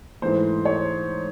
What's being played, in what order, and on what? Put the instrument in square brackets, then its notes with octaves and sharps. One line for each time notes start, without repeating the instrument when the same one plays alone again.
[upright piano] G#2 E3 A3 C5
C#5